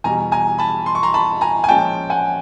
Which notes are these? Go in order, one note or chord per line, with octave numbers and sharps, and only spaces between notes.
E2 B2 G3 G#5 A#5
G#5 A#5
A5 B5
C6
C#6
A#5 C6
A5 B5
G#5 A#5
G#5
A#2 F3 G#3 C#4 G5 A5
F#5 G#5